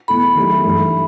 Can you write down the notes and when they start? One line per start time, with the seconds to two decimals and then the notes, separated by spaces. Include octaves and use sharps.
0.08 E2 B2 A3 E4 A4 B5
0.36 D#3 F#3 A3 E4 G4
0.64 G2 E3 A3